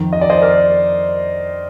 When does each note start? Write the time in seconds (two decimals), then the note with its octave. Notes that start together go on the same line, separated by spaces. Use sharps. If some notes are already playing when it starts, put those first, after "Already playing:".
Already playing: F2 D#3
0.13 D#5
0.21 D5
0.30 C5 D#5
0.42 A#4 D5